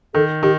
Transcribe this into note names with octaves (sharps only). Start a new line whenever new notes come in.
D#3 A4
D#3 G4